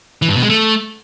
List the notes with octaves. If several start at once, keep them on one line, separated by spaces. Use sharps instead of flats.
E3
G2
B2
G#3
A3